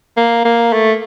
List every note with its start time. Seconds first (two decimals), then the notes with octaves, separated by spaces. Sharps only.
0.17 A#3
0.45 A#3
0.73 A3